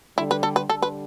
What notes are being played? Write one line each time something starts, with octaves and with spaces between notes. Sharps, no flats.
D3 G3 E4
B4
A4
B4
D3 G3 A4
B4